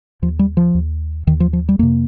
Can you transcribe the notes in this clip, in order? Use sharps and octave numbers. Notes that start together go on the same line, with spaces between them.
D#2 F3
G3
F3
D#2
D#2 D#3
F3
F3
G3
F2 C3 A#3